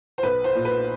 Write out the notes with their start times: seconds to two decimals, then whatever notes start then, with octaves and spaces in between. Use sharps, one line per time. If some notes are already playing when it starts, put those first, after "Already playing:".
0.18 C5
0.23 B1 B4
0.44 C5
0.55 A#2
0.65 B4